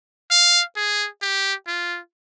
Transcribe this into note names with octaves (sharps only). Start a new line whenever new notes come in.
F5
G#4
G4
F4